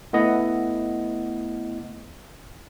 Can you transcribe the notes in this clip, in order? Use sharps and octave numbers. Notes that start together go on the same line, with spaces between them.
A3 B3 E4 D#5 F#5